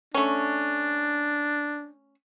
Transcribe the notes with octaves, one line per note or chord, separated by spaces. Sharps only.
A3 C#4 D4